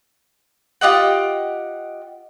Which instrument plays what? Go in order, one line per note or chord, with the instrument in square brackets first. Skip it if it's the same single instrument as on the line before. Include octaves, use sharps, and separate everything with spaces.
[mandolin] F4 G4 D#5 F#5